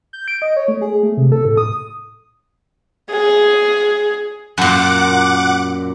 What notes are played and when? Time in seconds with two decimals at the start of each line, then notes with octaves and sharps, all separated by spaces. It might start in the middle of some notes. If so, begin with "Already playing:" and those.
0.13 G6
0.28 D7
0.42 D#5
0.57 C#5
0.68 A3
0.82 G#4
1.03 A3
1.17 C3
1.32 A4
1.45 A2
1.57 D#6
3.11 G#4
4.58 F#2 A#2 F#5 D6